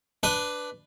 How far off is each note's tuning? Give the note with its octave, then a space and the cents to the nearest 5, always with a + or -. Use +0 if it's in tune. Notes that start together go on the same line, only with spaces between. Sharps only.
D4 +0 B4 +10